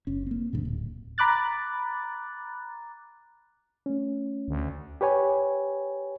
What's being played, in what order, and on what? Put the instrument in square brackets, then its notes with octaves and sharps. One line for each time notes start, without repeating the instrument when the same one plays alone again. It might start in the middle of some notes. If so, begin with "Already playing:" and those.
[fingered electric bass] F#1 C#4
A#3 C4
D2 G2 A#2
D1
[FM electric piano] A#5 B5 D6 F#6 A6
[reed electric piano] A3 C#4
[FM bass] D2
[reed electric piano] G4 B4 C#5 G#5